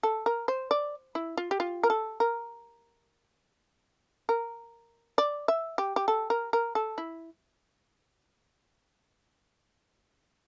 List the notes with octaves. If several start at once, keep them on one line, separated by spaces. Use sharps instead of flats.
A4
A#4
C5
D5
E4
F4
G4
F4
A#4
A4
A#4
A#4
D5
E5
G4
G4
A4
A#4
A#4
A4
E4